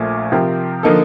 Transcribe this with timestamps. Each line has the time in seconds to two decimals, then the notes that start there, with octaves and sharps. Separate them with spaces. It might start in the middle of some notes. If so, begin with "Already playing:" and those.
Already playing: A#1 A#2 A3
0.32 C3 F3 C4 G4 A#4
0.83 D3 F3 A#3 D#4 A4